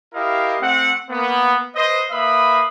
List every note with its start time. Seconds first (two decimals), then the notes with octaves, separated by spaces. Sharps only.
0.14 E4 G4 A#4 D#5 F5
0.60 A3 C4 F#5
1.10 A#3 B3
1.75 B4 C5 D#5
2.10 A#3 B4 E5 F5 B5 D#6